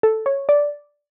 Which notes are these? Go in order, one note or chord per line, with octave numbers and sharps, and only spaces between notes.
A4
C#5
D5